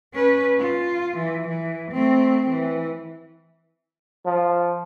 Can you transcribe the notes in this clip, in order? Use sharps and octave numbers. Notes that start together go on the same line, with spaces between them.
C#4 B4
F4
E3
E3
A3 C4
E3
F3